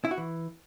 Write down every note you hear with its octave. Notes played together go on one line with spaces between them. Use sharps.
E4
F#4
E3